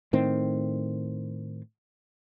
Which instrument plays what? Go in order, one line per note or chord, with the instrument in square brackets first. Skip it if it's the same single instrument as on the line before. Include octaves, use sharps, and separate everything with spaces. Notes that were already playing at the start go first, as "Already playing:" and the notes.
[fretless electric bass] A2 D#3 C4